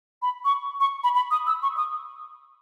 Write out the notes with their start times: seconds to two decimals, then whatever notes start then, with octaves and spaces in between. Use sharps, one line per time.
0.22 B5
0.45 C#6
0.80 C#6
1.04 B5
1.15 B5
1.31 D#6
1.47 E6
1.63 C#6
1.77 D#6